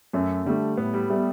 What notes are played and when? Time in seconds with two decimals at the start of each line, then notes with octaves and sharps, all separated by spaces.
0.13 F#2 A3
0.45 D3 G3 A3
0.77 A2 B3
0.94 G3
1.10 G3 A3 B3